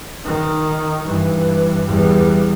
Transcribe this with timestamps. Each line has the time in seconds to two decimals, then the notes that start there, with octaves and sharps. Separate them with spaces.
0.25 D#3
1.05 G2 E3
1.86 E2 G3